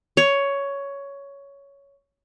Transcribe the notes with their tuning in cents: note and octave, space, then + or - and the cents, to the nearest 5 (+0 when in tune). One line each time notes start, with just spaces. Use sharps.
C#5 +10